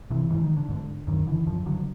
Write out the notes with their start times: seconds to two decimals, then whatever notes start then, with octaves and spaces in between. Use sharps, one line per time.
0.11 C3 E3
0.30 G#2 E3
0.44 D#3
0.57 D3
0.69 G#2 D3
1.07 F#2 D#3
1.27 D3 E3
1.47 F#2 F3
1.66 D3 F#3